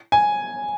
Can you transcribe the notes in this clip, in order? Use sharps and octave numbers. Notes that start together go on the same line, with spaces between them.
G#5